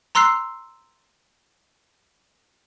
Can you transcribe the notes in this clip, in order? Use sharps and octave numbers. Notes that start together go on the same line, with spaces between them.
A#5 C6 E6 F#6 C7